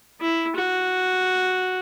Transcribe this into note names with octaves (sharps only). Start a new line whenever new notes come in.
E4
F#4